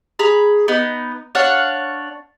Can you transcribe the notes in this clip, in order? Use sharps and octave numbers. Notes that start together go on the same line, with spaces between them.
G#4 A#5 B5
B3 D#4
D4 C#5 F5 F#5